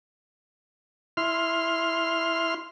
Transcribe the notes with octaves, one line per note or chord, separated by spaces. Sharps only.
E4 C6 F6